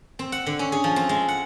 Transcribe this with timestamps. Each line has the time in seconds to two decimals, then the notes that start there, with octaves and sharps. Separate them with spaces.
0.19 C4
0.32 F#5
0.46 D3
0.59 C#4
0.72 G#4
0.84 F3
0.96 C4
1.09 G#3
1.28 F#5